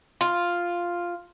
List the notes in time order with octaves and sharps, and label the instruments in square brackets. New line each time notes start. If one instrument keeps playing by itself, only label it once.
[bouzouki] F4